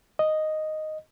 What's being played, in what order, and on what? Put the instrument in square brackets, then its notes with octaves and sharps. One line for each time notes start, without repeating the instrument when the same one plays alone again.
[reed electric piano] D#5